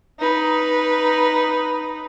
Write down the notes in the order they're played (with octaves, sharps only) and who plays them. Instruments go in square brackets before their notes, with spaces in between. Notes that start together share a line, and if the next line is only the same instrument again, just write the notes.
[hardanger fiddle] D#4 B4